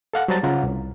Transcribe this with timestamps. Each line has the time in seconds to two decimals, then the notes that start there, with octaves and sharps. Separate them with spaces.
0.14 A4 F5 F#5
0.28 F#3 G3 C5 A5 A#5 A6
0.43 C#3 F4 F#5 A#5
0.64 C2